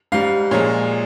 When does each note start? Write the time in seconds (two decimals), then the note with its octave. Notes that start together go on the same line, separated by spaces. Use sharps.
0.12 G#2 G3 F5
0.51 A#2 F3 G#3 C#5